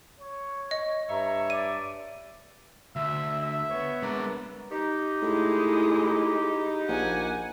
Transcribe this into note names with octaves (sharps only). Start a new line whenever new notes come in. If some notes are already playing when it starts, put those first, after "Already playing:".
C#5
D#5
G2 C#5 E5 A#5
D5 D#7
D2 E5 E6
E5
B3 C#5
G#3 D4 A#4
D#4 G4
A2 G#3 E4
A#1 F#5 G#5